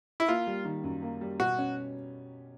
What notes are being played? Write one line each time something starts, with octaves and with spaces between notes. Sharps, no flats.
E4
A#3 F4
G3
D#3
F#2
A#3
G3
B2 F#4
C#4